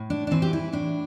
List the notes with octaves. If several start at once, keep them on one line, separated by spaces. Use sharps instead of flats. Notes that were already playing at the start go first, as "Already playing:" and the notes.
Already playing: A2
D4
D4
E3 C4
G4
E4
A2 D4